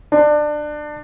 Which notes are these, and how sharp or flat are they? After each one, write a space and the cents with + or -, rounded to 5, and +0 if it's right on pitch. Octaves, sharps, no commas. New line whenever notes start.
D4 +25